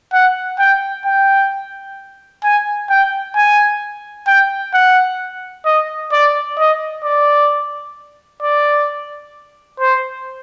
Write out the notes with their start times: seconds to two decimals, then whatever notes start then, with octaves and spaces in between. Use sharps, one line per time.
0.13 F#5
0.59 G5
1.05 G5
2.44 G#5
2.90 G5
3.36 G#5
4.28 G5
4.74 F#5
5.66 D#5
6.12 D5
6.58 D#5
7.04 D5
8.43 D5
9.80 C5